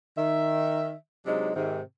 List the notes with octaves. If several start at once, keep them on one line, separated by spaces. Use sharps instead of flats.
D#3 E5
C3 F#3 G#3 C4 D4 D#4
G#2 C3 D#3